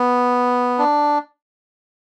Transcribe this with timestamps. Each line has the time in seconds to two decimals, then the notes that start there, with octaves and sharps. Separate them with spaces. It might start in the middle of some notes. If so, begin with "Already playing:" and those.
Already playing: B3
0.79 D4